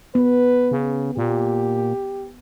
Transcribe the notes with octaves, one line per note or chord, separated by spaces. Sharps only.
B3 B4
C#3
A#2 G4